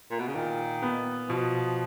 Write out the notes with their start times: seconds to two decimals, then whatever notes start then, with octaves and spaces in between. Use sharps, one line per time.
0.11 A#2
0.19 B2
0.27 C#3
0.35 A#2 D#3
0.82 B3
1.29 B2 F3